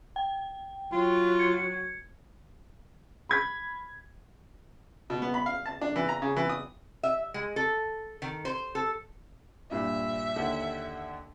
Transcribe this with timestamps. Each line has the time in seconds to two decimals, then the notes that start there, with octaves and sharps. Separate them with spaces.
0.16 G5
0.92 F#3 F4
1.39 G#6 C#7
3.29 B5 G#6 B6
5.10 B2
5.22 B3
5.34 B5
5.46 F5
5.66 A5
5.81 D4
5.96 E3
6.09 A#5
6.22 C#3
6.37 E3
6.49 D#6
7.03 E5
7.34 G#3
7.56 A4
8.22 D#3
8.45 C5
8.75 A4
9.71 G2 A#2 E5
10.36 D#2 D3 F#5